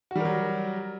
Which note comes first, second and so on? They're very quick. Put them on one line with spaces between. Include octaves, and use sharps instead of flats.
F#4 G3 A#4 F#3